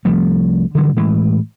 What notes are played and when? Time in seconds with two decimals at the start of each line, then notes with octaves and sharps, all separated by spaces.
0.05 C2 F3 A3
0.75 D3 E3 F#3 G3
0.97 A2 E3 G#3